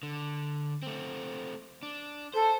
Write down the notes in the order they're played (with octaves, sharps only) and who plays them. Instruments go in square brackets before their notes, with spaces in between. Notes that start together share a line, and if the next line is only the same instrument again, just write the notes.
[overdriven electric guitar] D3
A3 C4
D4
[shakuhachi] A4 [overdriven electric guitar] C5